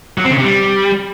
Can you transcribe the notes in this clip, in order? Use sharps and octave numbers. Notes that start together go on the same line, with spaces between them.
F#3
C4
C#3
C3
G3